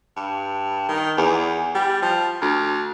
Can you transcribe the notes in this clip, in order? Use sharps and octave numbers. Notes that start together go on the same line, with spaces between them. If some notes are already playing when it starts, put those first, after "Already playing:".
G2
D#3
E2
G3
F3
D2